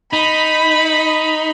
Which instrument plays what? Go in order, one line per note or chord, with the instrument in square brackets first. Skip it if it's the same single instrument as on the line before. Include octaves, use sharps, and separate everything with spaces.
[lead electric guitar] D#4 [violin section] B5